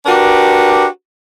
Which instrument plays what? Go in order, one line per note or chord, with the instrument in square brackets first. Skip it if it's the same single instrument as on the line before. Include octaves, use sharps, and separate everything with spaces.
[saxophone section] D4 F#4 G4 A#4 B4